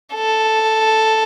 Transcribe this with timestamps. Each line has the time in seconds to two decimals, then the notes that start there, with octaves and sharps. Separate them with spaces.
0.14 A4